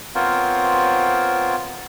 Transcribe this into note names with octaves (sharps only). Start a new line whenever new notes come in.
B3 C4 F4 A#4 C5 C#5